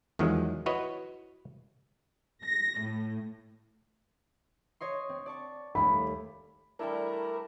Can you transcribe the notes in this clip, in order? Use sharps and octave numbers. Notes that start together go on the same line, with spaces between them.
E2 D#3 F3 F#3 G#3
E4 F#4 B4 C#5 D#5
A#6
A2
C#5 D#5 C6
C4
D5 A5 C#6
D#2 G3 A3 B5
G3 A3 D4 E4 A#4